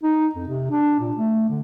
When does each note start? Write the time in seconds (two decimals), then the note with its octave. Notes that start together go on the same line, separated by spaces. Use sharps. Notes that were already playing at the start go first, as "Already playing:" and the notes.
0.03 D#4
0.35 F2
0.48 C3
0.70 D4
0.99 A#2
1.16 A3
1.49 D3